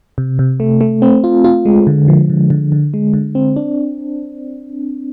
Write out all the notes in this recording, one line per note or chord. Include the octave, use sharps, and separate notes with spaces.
C3
C3
A3
A3
C4
F4
F4
G#3
D3
F3
D3
D3
D3
G#3
D3
C4
D4